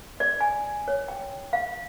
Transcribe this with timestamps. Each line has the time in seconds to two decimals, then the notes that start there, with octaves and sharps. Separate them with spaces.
0.20 D5
0.41 G#5
0.88 C#5
1.08 G5
1.53 F5